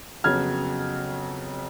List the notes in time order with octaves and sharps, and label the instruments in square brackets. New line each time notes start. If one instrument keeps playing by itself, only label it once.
[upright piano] F2 C#3 F#3 B3 F6 G#6